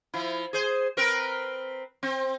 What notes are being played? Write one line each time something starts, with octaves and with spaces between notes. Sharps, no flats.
F3 E4
G#4 C5
C4 A#4 B4
C4